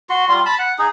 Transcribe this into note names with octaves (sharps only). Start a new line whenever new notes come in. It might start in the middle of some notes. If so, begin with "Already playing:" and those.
F#4 C6
G3 F4 C6
A5 B5
F#5
D#4 G#4